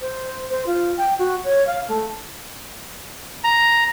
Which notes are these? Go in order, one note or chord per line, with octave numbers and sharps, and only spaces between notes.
C5
C5
F4
G5
F#4
C#5
F5
A3
A#5